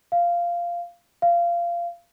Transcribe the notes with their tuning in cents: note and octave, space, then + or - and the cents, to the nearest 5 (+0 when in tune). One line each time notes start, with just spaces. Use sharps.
F5 -10
F5 -20